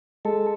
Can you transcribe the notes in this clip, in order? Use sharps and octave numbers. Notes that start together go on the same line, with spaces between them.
G#3 A4